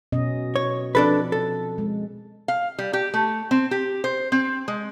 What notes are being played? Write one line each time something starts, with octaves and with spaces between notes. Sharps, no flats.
B2 C#4 D#5
C#5
F3 C4 D4 A4 B4
A4
G#3
F5
G3
G4
A3
C4
G4
C5
C4
G#3